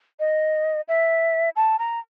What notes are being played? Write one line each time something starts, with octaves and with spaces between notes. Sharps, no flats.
D#5
E5
A5
A#5